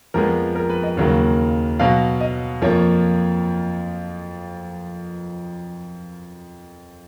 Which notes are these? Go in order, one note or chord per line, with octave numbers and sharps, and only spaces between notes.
F2 F3 G#3 B3 A#4
A#4
B4
D#5
D#2 C#3 F#3 A#3
B2 F#3 B3 F5
D#5
F2 F3 A#3 C#5